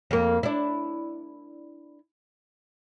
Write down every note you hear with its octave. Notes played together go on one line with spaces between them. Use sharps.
F2 A#3
D4 E4